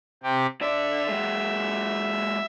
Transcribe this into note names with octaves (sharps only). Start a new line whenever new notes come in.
C3 G4
D3 D5 E5
F#3 G#3